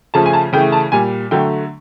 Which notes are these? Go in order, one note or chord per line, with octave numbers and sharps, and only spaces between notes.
C#3 F3 A3 A5
G#5
A5
C#3 E3 A3 G5
A5
A#2 G3 G#5
D3 F#3 A3 G5